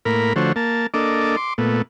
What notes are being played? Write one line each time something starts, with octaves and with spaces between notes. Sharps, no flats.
A2 A#3 A#4 B5
D3 F3 A3 F#4 C5 C#5
A#3 A5
A#3 D4 A4 D#5 D6
C6 D6
A#2 A3 B3